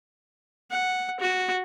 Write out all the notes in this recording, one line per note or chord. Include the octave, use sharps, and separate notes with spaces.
F#5
F#4